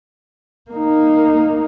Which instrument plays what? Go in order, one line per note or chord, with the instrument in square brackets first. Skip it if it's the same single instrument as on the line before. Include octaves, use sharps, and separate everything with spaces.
[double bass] A#3 D#4